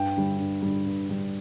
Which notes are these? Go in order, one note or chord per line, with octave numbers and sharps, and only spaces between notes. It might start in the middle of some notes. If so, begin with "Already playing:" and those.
Already playing: G2 G5
D3 G3
G2
D3 G3
G2
D3 G3